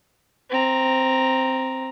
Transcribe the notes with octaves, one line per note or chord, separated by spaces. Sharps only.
C4 A#5